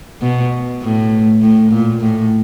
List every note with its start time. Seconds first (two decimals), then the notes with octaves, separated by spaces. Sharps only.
0.21 B2
0.82 A2
1.42 A2
1.72 A#2
2.02 A2